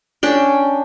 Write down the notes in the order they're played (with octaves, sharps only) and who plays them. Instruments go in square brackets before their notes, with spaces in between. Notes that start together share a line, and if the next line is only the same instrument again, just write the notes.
[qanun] C#4 D4 G5